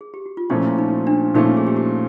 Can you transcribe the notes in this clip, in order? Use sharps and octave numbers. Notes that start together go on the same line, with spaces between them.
G#4
G4
F#4
F4
A#2 F3 A3 C#4 E4
E4
D#4
D4
A#2 F3 A3 C#4 D#4
G#4
G4
F#4